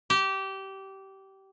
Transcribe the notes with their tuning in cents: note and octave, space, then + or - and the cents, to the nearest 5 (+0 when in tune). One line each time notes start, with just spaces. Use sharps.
G4 -20